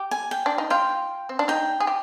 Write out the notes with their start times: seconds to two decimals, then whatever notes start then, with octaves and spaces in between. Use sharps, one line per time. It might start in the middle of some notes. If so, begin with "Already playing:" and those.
Already playing: G4
0.11 G#5
0.31 G5
0.46 D4
0.58 D#4
0.70 F4 G5
1.29 C4
1.39 D4
1.48 D#4 G5
1.80 G#4
1.87 G4